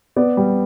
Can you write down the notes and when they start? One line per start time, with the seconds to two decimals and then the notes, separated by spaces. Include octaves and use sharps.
0.16 B3 D5
0.37 G3